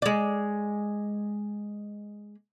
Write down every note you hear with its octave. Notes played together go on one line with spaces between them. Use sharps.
G#3 D5